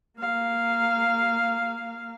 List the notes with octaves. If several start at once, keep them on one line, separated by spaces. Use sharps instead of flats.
A#3 F5